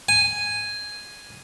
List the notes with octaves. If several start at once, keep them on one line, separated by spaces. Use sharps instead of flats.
G#5